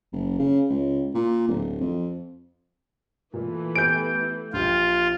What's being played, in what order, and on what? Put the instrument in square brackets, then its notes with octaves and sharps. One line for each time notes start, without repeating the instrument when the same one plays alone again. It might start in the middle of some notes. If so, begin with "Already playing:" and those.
[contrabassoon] F#1
C#3
C#2
A#2
D1
F2
[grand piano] A#2 [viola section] E3 A3
[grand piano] B3 G4 G#5 [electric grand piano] G6 D7
[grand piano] A#1 G4 F6 [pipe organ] F4